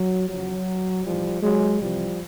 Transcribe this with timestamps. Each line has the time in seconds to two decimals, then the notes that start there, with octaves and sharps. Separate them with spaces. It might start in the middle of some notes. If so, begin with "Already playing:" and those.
Already playing: F#3
0.29 E2 C#3 F3 F#3
1.05 B1 A2 E3 F3 G3
1.43 F#3 G#3
1.81 C2 C3 E3 F3 G3